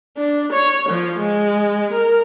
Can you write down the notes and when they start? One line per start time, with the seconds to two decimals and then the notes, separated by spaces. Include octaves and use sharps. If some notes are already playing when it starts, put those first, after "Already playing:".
0.18 D4
0.52 C#5
0.89 F3
1.20 G#3
1.93 A#4